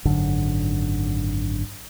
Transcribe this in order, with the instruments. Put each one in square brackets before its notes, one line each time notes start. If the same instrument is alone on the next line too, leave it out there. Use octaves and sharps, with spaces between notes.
[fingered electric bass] G#1 F#2 D3